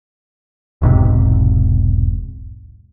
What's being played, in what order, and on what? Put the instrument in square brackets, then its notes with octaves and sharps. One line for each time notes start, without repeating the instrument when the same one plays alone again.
[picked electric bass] E1 B1 G#2 C3